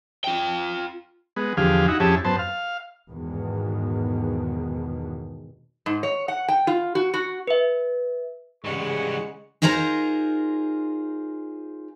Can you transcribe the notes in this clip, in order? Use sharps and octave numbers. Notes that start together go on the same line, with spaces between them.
F4 G5
G#3 B3
E2 D3 F3 G4 G#4 F5
D#4 E4 F#4
F2 C#4 E4 G4 G#4 A5
F#2 B3 C5 A5
F5
E2 G#2 B2 D#3
G#2
C#5
F#5
G5
F4
F#4
F#4
B4 E5
C#3 E3 G3 G#3 G#4 F#5 C#6
D#4 F4 G#4 A#4 C5 A#5